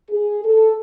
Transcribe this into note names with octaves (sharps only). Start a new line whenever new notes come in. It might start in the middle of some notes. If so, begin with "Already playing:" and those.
G#4
A4